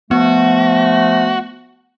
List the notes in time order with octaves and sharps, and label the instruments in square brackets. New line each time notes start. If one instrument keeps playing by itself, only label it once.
[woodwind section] F3 A3 [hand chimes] B3 [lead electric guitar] F#4